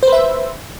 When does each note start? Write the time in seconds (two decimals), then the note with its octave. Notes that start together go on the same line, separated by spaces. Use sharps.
0.03 C5
0.08 B4
0.12 E5